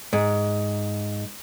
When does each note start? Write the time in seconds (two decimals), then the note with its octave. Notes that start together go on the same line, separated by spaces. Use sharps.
0.13 G#2